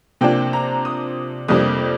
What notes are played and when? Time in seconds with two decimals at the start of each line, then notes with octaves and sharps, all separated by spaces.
0.21 C3 F3 A#3 D4 G5
0.53 A#5
0.85 D#6
1.48 F2 C3 G3 A#3 D4 D#6